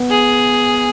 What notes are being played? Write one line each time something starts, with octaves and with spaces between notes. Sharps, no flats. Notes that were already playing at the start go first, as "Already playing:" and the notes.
Already playing: B3
G#4